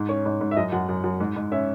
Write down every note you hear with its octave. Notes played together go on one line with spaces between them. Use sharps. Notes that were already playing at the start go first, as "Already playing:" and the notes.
Already playing: G#2
C#4 C#5
G#2
G#2
E5
F#2 D#5
F#2 F#5
F#2
F#2
G#2
G#2
C#4 E5